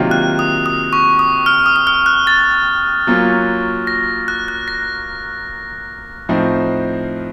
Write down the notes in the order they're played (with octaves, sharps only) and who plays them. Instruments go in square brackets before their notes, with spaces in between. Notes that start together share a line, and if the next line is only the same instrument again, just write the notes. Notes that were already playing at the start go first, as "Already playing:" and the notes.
Already playing: [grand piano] C3 D#3 F#3 A#3 F4
[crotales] F#6
D#6
D#6
C#6
D#6
F6
D#6
D#6
F6
F#6
A6
[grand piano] F#3 A#3 C#4 F4
[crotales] A#6
F#6
F#6
A#6
[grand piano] A2 F3 C4 D#4